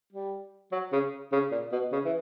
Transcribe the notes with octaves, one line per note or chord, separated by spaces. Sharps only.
G3
F#3
C#3
C#3
A#2
B2
C#3
E3